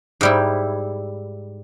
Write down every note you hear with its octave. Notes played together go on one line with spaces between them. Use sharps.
G#2 G3 E4